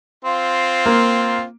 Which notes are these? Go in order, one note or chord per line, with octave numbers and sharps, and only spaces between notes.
C4 F4
A#3